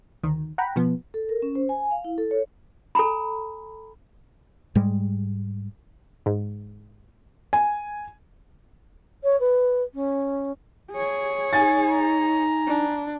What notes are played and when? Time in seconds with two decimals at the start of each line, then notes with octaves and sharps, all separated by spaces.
0.23 D2 D#3
0.58 F#5 G5 A#5 B5
0.76 B2 F3 B3
1.14 A4
1.29 A#4
1.42 C#4
1.55 C5
1.69 G#5
1.91 F5
2.05 E4
2.18 A4
2.31 C#5
2.95 A4 G#5 A#5 B5
4.75 G#2 G3 G#3
6.26 G#2
7.53 G#5
9.24 C#5
9.40 B4
9.94 C#4
10.92 G#4 C#5
11.53 D#4 G#5 A6
11.88 A#5
12.67 D4